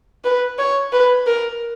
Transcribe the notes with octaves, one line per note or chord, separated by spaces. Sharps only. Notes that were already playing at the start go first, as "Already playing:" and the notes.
B4
C#5
B4
A#4